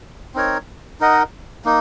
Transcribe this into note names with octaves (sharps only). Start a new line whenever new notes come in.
C4 D#4 A#4 C#5
D#4 A#4 D#5 F#5
A#3 D#4